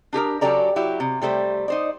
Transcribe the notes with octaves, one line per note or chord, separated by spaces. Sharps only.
D4 G4 G#4 A#4
C#3 F#3 G4 A4 D5 A#5
F#3 E4 G4
C3
C3 G3 A3 C5
D#4 C5 D5